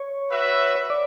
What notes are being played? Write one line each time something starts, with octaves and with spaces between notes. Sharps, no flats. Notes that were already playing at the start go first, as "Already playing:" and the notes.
Already playing: C#5
F#4 B4 E5
D5